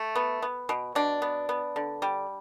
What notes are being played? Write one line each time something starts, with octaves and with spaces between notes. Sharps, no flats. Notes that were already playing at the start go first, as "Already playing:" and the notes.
Already playing: A3
B3
B3
B2
B2 D4
B3
B3
D3
G3